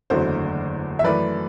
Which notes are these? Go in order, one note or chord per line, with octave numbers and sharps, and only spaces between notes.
F#1 E2 D3 F#3 A3 C5
E5
F#2 E3 A3 B4 D5